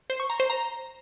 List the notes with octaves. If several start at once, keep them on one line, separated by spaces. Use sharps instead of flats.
C5
C#6
A#5
C5
A#5